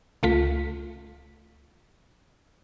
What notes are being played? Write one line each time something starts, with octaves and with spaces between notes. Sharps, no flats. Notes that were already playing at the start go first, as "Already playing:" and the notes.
C#2 A3 F4 B6